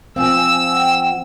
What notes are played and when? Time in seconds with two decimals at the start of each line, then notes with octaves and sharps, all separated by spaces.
0.16 F3 C4 F5 G#5 E6
0.72 F#5 G5